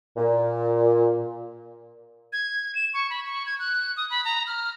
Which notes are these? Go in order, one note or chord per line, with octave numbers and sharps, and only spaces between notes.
A#2
G#6
E7
C#6
B5
C#6
G#6
F#6
D#6
B5
A#5
F6